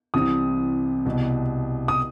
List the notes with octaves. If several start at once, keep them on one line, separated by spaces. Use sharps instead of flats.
C2 C3 E3 D#6
C2 B2
D#6